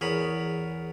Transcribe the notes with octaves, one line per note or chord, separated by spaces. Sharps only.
E2 G#4 A#4 C#5 B5